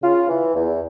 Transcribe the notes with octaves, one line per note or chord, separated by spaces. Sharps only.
C#3 F4
E3
E2